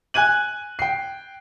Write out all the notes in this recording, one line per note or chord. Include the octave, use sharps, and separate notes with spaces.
G#5 F#6 G#6 D#7 F#7
G5 C7